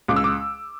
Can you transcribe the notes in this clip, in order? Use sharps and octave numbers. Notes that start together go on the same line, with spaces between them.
C#2 D6
E6
D6